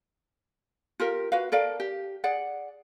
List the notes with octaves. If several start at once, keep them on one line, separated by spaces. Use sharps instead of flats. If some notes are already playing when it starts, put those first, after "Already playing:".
F4 G4 A#4
F#4 B4 F5
A4 A#4 D5 F5
G4
G#4 D5 F#5